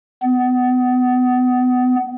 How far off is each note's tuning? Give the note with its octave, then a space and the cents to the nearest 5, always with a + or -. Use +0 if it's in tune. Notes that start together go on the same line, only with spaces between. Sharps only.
B3 +30